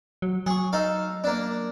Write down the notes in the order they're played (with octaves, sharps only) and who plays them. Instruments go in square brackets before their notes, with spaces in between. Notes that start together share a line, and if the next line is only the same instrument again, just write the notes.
[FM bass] F#3
[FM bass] F#3 [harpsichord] G#4 C#6
[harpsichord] D#4 A4 F5
A#3 D4